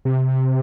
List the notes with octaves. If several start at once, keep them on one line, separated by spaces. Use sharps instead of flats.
C3